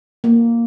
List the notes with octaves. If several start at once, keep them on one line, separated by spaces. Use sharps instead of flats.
A#3